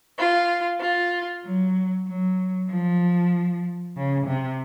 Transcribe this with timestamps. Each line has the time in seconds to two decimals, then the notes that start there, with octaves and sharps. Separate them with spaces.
0.18 F4
0.81 F4
1.44 F#3
2.07 F#3
2.69 F3
3.95 C#3
4.25 C3